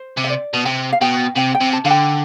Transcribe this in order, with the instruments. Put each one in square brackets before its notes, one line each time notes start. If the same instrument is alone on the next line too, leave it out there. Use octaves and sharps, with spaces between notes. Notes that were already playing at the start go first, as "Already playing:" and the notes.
Already playing: [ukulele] C5
[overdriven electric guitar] C3
[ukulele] E5
D5
[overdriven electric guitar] B2
[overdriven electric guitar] C3 [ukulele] G5
[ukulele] F5
[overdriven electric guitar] B2 [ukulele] G5
[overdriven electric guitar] C3 [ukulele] G5
[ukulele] G5
[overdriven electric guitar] C3
[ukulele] A5
[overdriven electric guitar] D3 [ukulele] F5
[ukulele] G5